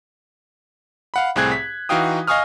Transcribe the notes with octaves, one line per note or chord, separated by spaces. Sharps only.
F5 F#5 B5
C2 A2 C4 G#4 F#6 G#6
B6
E3 D#4 F#4 F5 G5 D#6
D#5 F5 G#5 C#6 D#6 F6